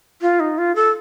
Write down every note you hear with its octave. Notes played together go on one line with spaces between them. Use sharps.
F4
D#4
F4
A4